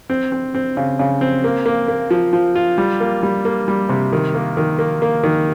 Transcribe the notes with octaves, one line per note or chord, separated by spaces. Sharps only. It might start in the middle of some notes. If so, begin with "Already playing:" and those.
C4
C4
C4
C#3
C#3
C4
A#3
A#3
A#3
F3
F3
F4
G3
A#3
G3
A#3
G3
C3
D#3
A#3
D#3
A#3
A#3
D#3